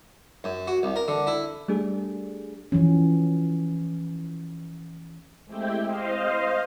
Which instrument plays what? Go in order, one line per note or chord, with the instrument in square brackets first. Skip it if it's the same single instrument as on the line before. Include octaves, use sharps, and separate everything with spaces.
[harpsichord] F#2
F#4
C2
A#4
D3
E4
[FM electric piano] G3 A3 D4 G#4
[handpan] E3 F3 C#4
[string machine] G#3 A3 C4 E4 G4 G5
C5 D#5 F5